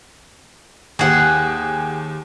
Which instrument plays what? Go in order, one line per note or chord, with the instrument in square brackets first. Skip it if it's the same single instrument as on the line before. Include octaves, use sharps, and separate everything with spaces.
[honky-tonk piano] D#2 G4 [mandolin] G#4 F#5